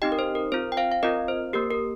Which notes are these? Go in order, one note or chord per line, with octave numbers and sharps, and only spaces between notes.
C4 D#4 G4 D#5 G5
A#4
C5
A#4
C4 F4 C5
G5
C5 F5
F5
C4 F4 A#4 D#5
C5
A#3 G4 A#4
A#4